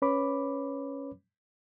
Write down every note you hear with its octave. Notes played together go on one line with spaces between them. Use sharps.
C#4 B4 C#5 B5 D6